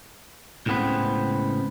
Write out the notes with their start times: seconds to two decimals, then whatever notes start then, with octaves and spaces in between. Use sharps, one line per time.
0.66 C#2 A2 C#3 B3 C4 B4